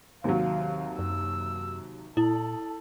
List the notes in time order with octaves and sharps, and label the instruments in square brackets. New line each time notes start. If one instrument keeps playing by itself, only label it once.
[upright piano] D#2 C3 F#3 [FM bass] D#3 [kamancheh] F5
[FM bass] F#2 [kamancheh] E6
[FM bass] A#2 [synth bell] E4 [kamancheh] A4